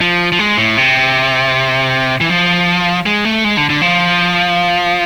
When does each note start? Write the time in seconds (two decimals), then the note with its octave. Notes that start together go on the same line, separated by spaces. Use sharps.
0.01 F3
0.32 F3
0.39 G#3
0.58 A2
0.77 C3
2.21 E3
2.30 F3
3.06 G#3
3.25 A3
3.44 G#3
3.57 D3
3.70 D3
3.82 F3